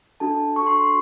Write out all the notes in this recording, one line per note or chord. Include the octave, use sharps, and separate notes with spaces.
D4 F#4 A4 A5
D4 F#4 A4 C#6
C6
C#6
C6